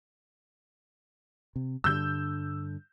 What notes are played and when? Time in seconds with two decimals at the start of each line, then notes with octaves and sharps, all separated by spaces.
1.56 C3
1.84 G2 D3 G3 E6 G6